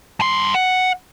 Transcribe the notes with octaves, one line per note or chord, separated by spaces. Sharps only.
G2 C6
F#5